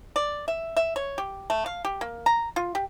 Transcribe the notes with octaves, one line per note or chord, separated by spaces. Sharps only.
D5
E5
E5
C#5
G4
A3
F5
G4
A#3
A#5
F4
G4